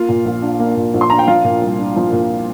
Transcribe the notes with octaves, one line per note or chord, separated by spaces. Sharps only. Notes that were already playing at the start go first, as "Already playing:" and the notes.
Already playing: A#3 F4 F5
A#2
A#1
D4
A#3
A#2
A#1
C6
D4 A#5
G5
F3 F4 F5
A#2
C2
D4
F3
A#2